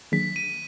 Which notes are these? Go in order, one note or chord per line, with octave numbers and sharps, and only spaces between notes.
D#3 F#3 A#3 D4 G#4 B6
D#7